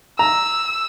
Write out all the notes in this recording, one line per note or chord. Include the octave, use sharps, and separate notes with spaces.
A#5 E6